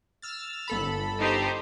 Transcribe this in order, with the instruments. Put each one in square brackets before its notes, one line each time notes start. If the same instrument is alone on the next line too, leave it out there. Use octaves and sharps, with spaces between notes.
[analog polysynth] E6 F6 A6
G1 A4 B5
[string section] D#4 G4 C5